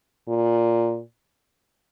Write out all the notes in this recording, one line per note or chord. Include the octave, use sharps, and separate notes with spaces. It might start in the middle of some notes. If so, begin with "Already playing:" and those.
A#2